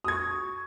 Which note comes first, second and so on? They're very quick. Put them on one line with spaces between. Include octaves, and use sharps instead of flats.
D#6 G#6 C#6